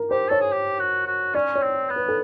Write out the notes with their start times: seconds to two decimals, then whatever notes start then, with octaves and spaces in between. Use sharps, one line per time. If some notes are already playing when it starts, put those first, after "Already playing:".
Already playing: A#4
0.10 G4 C5
0.28 A4 C#5
0.40 G#4
0.52 G4
0.80 F#4
1.07 F#4
1.35 C#4 D5
1.55 C#5
1.62 C4
1.90 B3
1.96 B4
2.08 A4